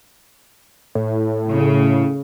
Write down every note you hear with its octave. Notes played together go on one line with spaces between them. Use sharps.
A2
C#3